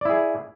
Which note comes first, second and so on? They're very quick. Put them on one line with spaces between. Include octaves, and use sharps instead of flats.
D5 E4 G#4